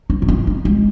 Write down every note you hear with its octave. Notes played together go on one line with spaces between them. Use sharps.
D#4
D#4
E4
D#4
G#3